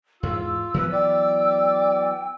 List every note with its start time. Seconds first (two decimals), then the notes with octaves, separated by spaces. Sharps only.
0.23 E2 G#2 F4 E6
0.74 E3 F#3 B3 B4
0.93 D5 G5